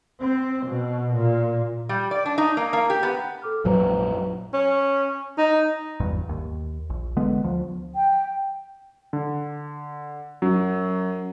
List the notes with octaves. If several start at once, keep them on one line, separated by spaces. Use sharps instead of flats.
C4
B2
A#2
G3
D5
D4
D#4
A#3
A#3
G4
B3
A4 D6 F6
A#1 F#2 F#3 B4 C5 A#5
C#4
D#4
G#1 E2 G2
D#2
A#1
D3 G#3 B3
D2 F3
G5
D3
F#2 F#3